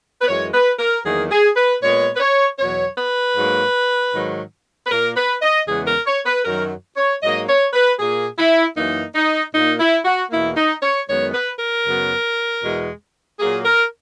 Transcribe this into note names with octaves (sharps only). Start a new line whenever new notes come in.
B4
F#2 E3 G#3 C#5
B4
A#4
E2 D#3 F#3 A#3 G#4
G#4
B4
A#2 G#3 B3 C#5
B4
C#5
E2 B2 F#3 C#5
B4
G#2 F#3 A#3
G#2 D#3 F#3
B4
A#2 A#3 A#4
B4
D#5
E2 C#3 G#3 B3 G#4
A#4
C#5
B4
F#2 D#3 F#3 A#4
C#5
G#2 F#3 A#3 D#5
C#5
B4
A#2 A#3 G#4
E4
F#2 E3 A#3 D#4
D#4
A#2 A#3 D#4
E4
F#4
E2 B2 A#3 E4
D#4
C#5
F#2 D#3 G#3 B3 C#5
B4
A#4
F#2 C#3 F#3 B3
E2 B2 G#3
A#2 F#3 A#3 G#4
A#4